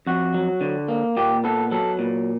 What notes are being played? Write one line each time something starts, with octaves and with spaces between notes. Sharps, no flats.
F2 F#4
F#3
D3
A#3
A#2 G4
B3 A4
F#3 A4
A#2